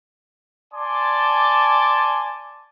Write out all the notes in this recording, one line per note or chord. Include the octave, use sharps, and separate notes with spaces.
D5 G#5 A5 C6 D6